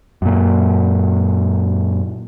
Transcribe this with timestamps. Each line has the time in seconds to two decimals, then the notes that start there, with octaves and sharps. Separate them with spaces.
0.22 F#2 A#2